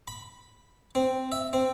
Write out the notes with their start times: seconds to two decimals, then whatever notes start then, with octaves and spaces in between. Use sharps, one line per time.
0.08 B5
0.95 C4
1.32 E5
1.53 C4